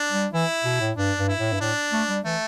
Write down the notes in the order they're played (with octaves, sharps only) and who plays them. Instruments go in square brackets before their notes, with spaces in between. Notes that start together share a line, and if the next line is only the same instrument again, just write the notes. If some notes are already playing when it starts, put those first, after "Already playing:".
Already playing: [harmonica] D4
[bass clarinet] G3
[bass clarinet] E3 [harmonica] E4
[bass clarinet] B2
A2
[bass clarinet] G2 [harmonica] D4
[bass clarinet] G2
[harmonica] E4
[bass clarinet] A2
G2
[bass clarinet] A2 [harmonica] D4
[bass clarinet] A3
G3
[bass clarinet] E3 [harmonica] A3